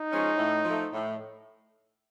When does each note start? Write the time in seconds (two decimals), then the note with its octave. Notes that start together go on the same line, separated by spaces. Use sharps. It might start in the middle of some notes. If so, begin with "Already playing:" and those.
Already playing: D#4
0.11 F3 G#3 C#4
0.38 A2
0.64 F3
0.70 A3
0.92 A2